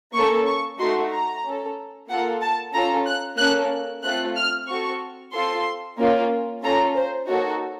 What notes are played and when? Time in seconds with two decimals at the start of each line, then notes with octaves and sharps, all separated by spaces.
0.15 A#3 C#4 A4 C#6
0.46 C#6
0.79 A3 D#4 F#4 A4 C6
1.12 A#5
1.44 C#4 A4
2.09 A#3 F4 A4 F#5
2.42 A5
2.74 C#4 F4 A4 A#5
3.06 F#6
3.38 A#3 C#4 A4 F#6
4.04 A3 C4 F4 A4 F#6
4.36 F6
4.68 C4 F#4 A4 C#6
5.34 C4 F4 A4 C6
5.98 A#3 C#4 F4
6.63 C#4 F4 A4 A#5
6.95 C5
7.28 A#3 D#4 F#4 A4 C#5